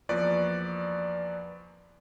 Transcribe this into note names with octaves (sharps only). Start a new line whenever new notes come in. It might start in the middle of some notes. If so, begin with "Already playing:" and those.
E2 F3 A#3 B4 D5 C#6